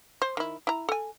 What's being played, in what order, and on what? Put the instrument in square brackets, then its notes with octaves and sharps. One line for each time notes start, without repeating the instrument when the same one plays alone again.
[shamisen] C5
D#3 E4
E4 A#5
A4 G#5